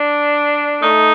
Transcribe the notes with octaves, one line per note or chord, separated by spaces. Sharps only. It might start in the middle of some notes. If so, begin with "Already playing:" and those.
Already playing: D4
A3 D#4